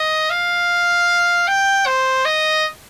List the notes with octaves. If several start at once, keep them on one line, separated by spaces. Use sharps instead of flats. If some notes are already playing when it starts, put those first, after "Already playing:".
Already playing: D#5
F5
G5
C5
D#5